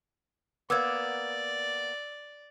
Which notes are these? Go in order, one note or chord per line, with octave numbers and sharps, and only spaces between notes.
A#3 B3 D5 D6 E6 G#6